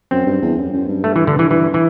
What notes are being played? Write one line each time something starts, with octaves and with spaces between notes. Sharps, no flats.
F#2 C4
G2
E2
F#2
F#2
G2
A3
E3
D3
E3
G2 E3
E3